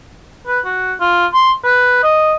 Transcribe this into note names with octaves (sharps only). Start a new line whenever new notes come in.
B4
F#4
F4
C6
B4
D#5